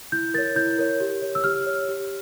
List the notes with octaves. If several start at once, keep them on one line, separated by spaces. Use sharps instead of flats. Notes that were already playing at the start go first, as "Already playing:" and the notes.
E4 G6
A#4 C#5 A6
E4 G6
A#4 C#5
G4
C#5
E6
G4 F6
C#5
G4